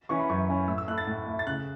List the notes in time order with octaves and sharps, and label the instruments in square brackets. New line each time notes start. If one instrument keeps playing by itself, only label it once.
[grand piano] E3 C#4 E4 C#6
B5
F#2 C#6
E3 C#4 E4
A2 E6
E6
A3 E4 F#6
A6
A2
A3 E4
A6
C#3 F#6